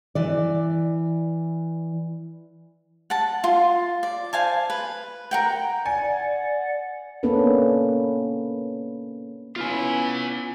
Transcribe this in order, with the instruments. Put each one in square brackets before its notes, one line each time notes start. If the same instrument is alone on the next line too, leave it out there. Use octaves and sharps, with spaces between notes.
[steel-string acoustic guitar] E3 D5
[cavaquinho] F#5 A5
F4 C6
D5
C5 F5 G#5 A5
B4
A#4 F#5 G5
[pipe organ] D5 F#5 [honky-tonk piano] G#5
[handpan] A#3 B3 C#4 D4 A4 B4
[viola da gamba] B3 C#4 E4 [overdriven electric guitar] F4 G#5